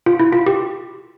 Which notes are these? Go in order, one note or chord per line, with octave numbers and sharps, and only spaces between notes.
F4
E4
F4
G4